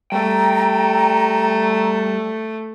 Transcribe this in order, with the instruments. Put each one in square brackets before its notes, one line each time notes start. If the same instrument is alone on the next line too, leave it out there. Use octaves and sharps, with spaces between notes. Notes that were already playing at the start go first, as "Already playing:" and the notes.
[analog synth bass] G3 [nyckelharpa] A3 [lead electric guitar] G5 [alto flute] A#5